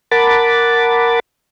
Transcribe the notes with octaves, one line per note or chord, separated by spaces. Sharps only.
A#4 F#5 A5 B5 D6 A6